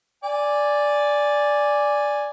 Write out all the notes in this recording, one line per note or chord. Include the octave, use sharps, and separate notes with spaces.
D5 G#5